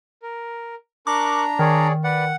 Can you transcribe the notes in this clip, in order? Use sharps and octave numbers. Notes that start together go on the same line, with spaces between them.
A#4
D4 A#4 A#5 C#6 D6 F#6
D#3 G#4 C#5 D5
B4 D5 F#5